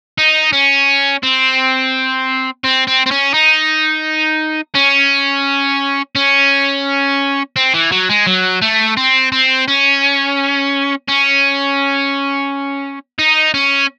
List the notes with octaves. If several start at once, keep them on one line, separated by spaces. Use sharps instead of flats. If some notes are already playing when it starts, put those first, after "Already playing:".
D#4
C#4
C4
C4
C4
C4
C#4
D#4
C#4
C#4
C4
E3
F#3
G#3
F#3
A3
C4
C4
C#4
C#4
D#4
C#4